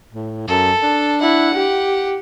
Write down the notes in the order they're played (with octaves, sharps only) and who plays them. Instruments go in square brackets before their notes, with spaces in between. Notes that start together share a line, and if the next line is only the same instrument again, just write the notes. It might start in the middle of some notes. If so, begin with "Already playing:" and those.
[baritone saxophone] A2
[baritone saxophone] F#2 [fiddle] A4
[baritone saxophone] D4
[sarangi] E4 [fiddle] F#5
[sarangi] G4